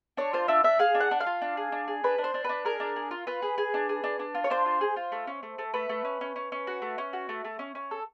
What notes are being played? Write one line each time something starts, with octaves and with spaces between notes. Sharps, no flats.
D4 C#5
F4 C5
D4 E5
D4 E5
G#4 F5
D4
F#5
D4
F5
F4
D4
G#4
D4
G#4
D4 B4
D4
C5
D4
D4 B4
G#4 A#4
D4
G#4
F4
F4 B4
G#4
G#4
D4
G#4
D4
D4
F4
C#5
D4 C5
F4
G#4
F4
A3
C#4
A3
A3
A3 B4
A3
C#4
C#4
C#4
C#4
F#4
A3
C#4
F#4
A3
A3
C#4
C#4
A4